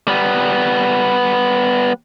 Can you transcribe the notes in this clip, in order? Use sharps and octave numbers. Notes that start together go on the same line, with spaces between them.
G3 B3